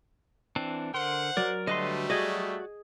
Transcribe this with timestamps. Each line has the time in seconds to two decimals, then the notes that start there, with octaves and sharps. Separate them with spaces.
0.56 E3 C4 D4
0.94 D3 A#4 C5 F#5 C6
1.37 F#3 A#4 D5
1.67 D3 G3 A3 B4 D#5 C6
2.10 F#4 G#4 D5 D#5